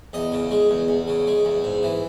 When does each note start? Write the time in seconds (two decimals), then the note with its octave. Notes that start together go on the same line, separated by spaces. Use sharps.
0.13 E2 D#5
0.32 C#3
0.51 G#3
0.70 E2
0.88 E2
1.08 C#3
1.27 G#3
1.45 E2
1.64 G#2
1.83 E3